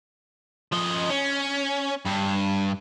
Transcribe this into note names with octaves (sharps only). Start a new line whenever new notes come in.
F3 D#5
C#4
G2